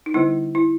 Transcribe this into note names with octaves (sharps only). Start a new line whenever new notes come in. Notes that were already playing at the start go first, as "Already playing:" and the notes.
D#4
D3 G3 B3 E4
E4